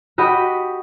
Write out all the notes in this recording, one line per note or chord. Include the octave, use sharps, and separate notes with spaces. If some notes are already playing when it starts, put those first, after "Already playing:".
F#4 G4 D#5 B5